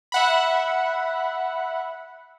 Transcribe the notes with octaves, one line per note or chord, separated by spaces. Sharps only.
E5 F#5 B5